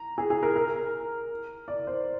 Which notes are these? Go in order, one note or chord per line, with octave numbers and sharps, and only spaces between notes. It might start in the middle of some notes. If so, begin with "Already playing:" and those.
Already playing: A#5
G#4
G#4
A#4
A#4
D5
C5